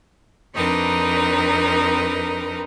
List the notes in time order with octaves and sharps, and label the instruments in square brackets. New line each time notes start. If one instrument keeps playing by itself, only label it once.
[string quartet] F2 C4 D4 D#4 A#4 B4